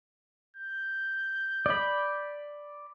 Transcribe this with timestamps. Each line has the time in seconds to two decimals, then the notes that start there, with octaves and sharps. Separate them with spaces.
0.56 G6
1.66 D5 B5